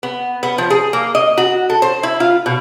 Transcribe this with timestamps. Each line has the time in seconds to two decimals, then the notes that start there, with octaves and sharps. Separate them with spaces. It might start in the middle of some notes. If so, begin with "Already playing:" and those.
0.03 B3
0.43 B3
0.58 F3
0.70 G#4
0.93 A#3
1.15 D#5
1.38 F#4
1.70 A4
1.82 C5
2.03 E4
2.20 F4
2.46 B2